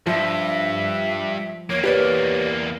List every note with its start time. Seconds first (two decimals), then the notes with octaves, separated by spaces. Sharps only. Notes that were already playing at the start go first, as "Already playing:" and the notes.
0.07 G2 F3 E5
1.70 E2 A#3 C#5
1.84 G4 B4 C#5 D5